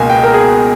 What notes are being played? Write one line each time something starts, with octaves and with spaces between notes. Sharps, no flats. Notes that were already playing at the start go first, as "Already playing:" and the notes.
Already playing: C#2 B2 A#3 G#5
G5
A#4
G#4